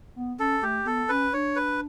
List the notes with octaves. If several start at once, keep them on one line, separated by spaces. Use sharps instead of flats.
B3
C#4 A4
A3 G4
B3 A4
C#4 B4
D4 C#5
B4